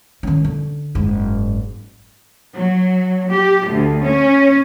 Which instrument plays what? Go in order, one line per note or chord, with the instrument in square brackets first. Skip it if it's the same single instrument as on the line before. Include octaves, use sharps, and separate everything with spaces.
[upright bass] D#3 C#4
D3
F#1 G#2
[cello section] F#3
G4
D2
C#4